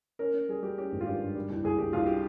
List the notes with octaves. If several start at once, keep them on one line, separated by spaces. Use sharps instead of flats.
C#4 A#4
C#4
G3 G#4
G3 G4
C#4 G4
G#1
F4
G2 G4
G2
G3
C2 G4
C2 G#4
C2 G4
C2 F4
G4